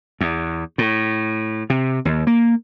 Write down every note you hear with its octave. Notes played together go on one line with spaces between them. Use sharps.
E2
A2
C3
D#2
A#3